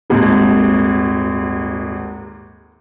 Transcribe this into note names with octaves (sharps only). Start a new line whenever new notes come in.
D#1 G#1 D#2